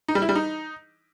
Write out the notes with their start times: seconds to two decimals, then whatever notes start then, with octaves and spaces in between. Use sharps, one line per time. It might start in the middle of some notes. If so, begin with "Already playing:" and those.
0.08 D#4
0.15 G3
0.22 E4
0.29 G3
0.35 D#4